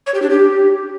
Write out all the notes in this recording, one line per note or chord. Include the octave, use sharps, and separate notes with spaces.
C#5
G4
D4
G4